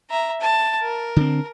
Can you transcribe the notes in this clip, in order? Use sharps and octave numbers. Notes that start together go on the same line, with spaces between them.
E5 A#5
A5
A#4
D3 C4